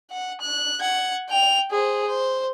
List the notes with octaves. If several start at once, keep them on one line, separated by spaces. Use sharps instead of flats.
F#5
F#6
F#5 G#6
G5 F7
G#4 C5
C5